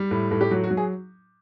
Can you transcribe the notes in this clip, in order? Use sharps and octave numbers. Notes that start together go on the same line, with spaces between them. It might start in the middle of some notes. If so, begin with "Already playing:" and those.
Already playing: G3
A2
A2
G4
F#3 F#4
F#4
F#3
G#4